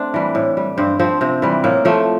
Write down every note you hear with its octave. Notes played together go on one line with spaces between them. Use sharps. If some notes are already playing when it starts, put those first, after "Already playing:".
Already playing: A3 C4 D4
E3 G3
A2
G3
G2 C4
F3 C4
C3 C4
E3 G3
A2 A#3
F3 A3